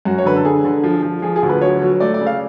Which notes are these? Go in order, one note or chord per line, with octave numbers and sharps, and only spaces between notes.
F#2 F#4
C#5
D3 B4
A4
D3 G#4
D3
F3
F3
F3 G#4
G#4
D2
B4
F#3 C#5
F#3
A3 D5
D5
C#3
F5